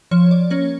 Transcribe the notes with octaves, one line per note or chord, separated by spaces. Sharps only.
F3 C#5
D5
A#3 C#4 C#5